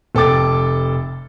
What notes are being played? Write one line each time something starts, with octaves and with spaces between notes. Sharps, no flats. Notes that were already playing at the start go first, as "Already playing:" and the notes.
F1 A4 G5 D6 A6